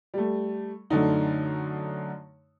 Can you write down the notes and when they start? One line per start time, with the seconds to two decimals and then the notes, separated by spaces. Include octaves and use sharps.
0.14 G3 A3
0.90 F#2 D3 A3 D#4